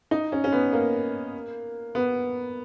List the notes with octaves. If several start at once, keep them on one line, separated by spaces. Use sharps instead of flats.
D#4
C#4
C#4
B3
A#3
B3